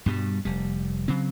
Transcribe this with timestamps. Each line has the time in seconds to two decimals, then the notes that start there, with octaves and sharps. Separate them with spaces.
0.06 G2 B2 G3
0.45 F1 G3
1.08 C#3 F#3 C4